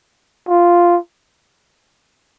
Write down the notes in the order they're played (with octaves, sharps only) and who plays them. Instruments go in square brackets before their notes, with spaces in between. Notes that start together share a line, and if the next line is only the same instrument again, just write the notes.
[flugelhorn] F4